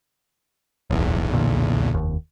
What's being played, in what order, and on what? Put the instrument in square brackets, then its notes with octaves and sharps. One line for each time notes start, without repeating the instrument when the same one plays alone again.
[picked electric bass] D1 [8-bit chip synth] B1 E2
[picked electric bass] A#2 D3
F1 D#2